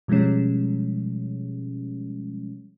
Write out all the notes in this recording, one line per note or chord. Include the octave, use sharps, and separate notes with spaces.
B2 F3 G3 G#3 C#4